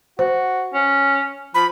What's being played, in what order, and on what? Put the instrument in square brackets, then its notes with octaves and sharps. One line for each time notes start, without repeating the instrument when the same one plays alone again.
[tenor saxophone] F#4 [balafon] C5
[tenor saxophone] C#4
[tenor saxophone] F3 [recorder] B5